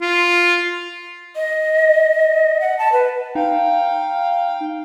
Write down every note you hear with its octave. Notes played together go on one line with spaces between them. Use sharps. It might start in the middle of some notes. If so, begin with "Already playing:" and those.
F4
D#5
F#5
A5
B4
D#4 F5 G5